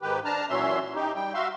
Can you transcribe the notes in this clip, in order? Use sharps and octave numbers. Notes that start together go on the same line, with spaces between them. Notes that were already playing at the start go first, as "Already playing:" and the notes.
G#2 D#3 G4 B4
D4 A5 A#5 F6
A#2 E3 F#3 C#4 E5 C6
D#4 G4
G3 G5
F#4 E5 F5 C6